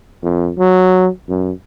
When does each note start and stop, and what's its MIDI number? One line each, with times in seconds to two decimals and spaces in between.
0.23 0.51 41
0.58 1.08 54
1.29 1.51 42